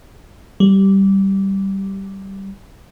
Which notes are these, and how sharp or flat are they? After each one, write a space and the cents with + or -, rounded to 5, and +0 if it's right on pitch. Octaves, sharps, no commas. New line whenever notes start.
G3 -10